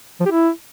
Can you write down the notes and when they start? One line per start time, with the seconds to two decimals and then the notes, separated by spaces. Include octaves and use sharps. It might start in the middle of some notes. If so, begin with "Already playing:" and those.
0.20 F3
0.26 G4
0.31 E4